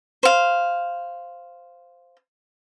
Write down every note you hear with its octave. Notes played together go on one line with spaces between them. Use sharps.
C5 F5